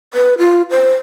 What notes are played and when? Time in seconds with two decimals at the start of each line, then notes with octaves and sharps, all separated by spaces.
0.14 B4
0.38 F4
0.71 C5